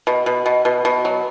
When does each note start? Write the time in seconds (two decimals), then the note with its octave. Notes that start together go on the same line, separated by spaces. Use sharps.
0.07 B2
0.26 B2
0.46 B2
0.65 B2
0.85 B2
1.05 F#3